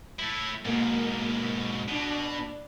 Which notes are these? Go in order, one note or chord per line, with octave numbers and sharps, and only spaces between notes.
A3 E4
G#2 B2 A#3
B2 D4